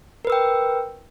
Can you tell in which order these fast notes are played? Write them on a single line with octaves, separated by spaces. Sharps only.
A#4 B4 E6 G5